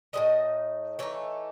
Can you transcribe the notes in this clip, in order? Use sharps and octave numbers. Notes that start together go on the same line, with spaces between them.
A2 G#3 D#4 D#5
E3 A3 D#4 C#5